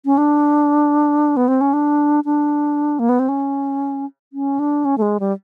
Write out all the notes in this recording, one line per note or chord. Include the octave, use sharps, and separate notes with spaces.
C#4
D4
B3
C4
C#4
D4
D4
A#3
B3
C4
C#4
C#4
D4
C#4
A3
G#3
G3